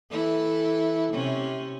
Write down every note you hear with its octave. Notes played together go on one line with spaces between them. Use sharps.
E3 E4 A4
C3 C#4